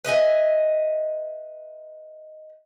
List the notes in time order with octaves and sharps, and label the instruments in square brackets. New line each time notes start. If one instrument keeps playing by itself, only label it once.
[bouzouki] B4 D#5 E5 G#5